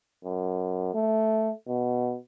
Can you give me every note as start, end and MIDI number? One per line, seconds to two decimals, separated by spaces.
0.24 0.94 42
0.94 1.50 57
1.68 2.16 47